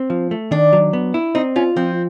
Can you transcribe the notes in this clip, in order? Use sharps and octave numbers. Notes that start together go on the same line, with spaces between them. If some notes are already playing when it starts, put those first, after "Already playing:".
Already playing: C4
F3
A3
D#3 D4
F#3
B3
E4
C4 D#4
C#4 F4
F3 C4